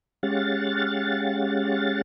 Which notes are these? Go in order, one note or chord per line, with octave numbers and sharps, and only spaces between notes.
G#3 C#4 G4 F5 F#5 A6